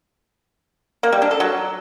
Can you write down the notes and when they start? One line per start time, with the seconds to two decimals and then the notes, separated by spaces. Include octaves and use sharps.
1.03 A#3
1.12 G3
1.22 D4
1.31 A4
1.40 F#3